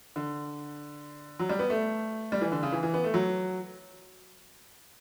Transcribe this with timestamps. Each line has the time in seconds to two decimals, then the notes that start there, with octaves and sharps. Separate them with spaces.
0.16 D3
1.39 F#3
1.49 G3
1.59 B3
1.70 A3
2.32 G3
2.41 E3
2.52 D3
2.63 C#3
2.72 E3
2.83 E3
2.94 B3
3.04 A3
3.14 F#3